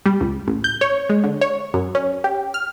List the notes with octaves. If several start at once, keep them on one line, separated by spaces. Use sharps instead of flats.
G3
C#2
A1
G6
C#5
G#3
D3
C#5
F#2
C#4
G4
F6